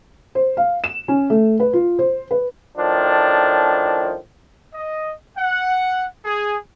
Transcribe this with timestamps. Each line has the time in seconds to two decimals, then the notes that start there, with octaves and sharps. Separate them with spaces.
0.35 C5
0.57 F5
0.84 E7
1.08 C#4
1.30 A3
1.60 B4
1.73 F4
1.99 C5
2.31 B4
2.77 A2 D#3 F3 D4
4.74 D#5
5.38 F#5
6.25 G#4